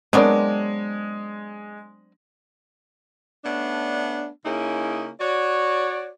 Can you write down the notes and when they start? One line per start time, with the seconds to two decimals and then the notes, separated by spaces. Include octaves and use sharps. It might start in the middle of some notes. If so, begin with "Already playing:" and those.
0.13 F#3 G#3 B3 C4 D4 A#4 D5
3.44 A3 B3 C#4 D4
4.44 C#3 A#3 C#4 D#4 E4 G#4
5.20 F#4 C#5 D5